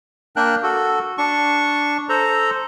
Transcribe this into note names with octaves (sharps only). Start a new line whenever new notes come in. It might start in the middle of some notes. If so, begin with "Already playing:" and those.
A#3 D4 A#4 G5 F#6
F#4 A4
D4 C#6
A4 C5 A#5